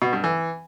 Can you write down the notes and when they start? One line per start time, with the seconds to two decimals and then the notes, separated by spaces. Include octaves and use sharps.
0.02 B2
0.13 G2
0.24 E3